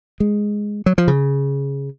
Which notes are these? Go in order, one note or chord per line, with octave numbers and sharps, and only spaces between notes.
G#3
F#3
F3
C#3